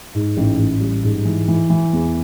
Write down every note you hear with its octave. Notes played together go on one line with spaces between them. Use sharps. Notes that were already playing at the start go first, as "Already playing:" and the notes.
G#2
A1
A1
G3
G#2
E3
E3
E3
E2